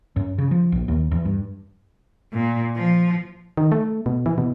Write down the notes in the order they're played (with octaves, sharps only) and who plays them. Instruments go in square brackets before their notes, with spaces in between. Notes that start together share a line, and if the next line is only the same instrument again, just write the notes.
[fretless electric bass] F#2
C#3
F3
A#1
D#2
E2
G2
[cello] A#2
F3
[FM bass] D#3
A3
B2
E3
B2